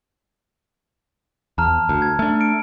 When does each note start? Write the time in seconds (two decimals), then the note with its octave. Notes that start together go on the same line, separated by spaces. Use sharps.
1.58 E2 A5 A#5 F6
1.89 D2
2.02 G#6
2.19 A3 D4
2.40 F6 C#7 D7